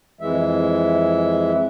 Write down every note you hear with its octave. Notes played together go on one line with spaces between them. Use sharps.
F2 E3 G#3 E5